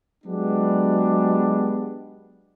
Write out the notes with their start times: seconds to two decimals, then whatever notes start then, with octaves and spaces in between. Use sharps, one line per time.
0.24 F#3 G#3 B3 D4 G4